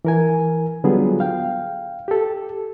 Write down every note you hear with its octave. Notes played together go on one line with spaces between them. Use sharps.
E3 A#4 G#5
D3 F#3 G3 B3 F4 G#4
F5 G5
G4 A4